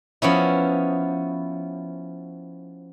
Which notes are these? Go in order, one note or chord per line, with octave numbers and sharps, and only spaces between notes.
F3 B3 C#4 E4